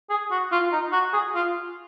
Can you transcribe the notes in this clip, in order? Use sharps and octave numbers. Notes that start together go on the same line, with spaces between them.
G#4
F#4
F4
D#4
F#4
G#4
F4